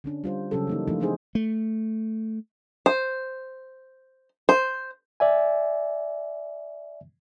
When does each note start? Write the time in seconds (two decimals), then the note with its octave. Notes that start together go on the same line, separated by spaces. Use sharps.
0.04 D3 C#4 D4
0.24 G3 F4 C5
0.51 C#3 F#3 C#4 G4 A4
0.67 E3 A#3 D#4
0.88 F3 A3 D4 E4 F4
1.00 C4 D4 D#4 G4 G#4 C5
1.35 A3
2.86 C5
4.49 C5
5.20 D5 E5 G#5